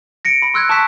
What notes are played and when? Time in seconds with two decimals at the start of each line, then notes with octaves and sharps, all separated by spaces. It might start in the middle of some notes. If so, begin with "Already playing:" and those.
0.25 A#6 C#7 D7
0.42 B5
0.54 C6 E6 F#6 G#6
0.69 A5 C#6 D#6 F#6 B6